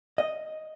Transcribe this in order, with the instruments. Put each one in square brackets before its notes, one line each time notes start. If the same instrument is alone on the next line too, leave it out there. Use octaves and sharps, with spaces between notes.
[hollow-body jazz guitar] D#5